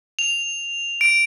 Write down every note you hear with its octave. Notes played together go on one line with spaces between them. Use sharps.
F7
D7